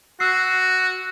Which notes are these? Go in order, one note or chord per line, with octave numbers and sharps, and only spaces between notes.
F#4 E6 C7